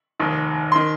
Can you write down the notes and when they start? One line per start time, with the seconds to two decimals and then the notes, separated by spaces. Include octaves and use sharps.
0.20 F1 D#2 D#3
0.72 D#3 C6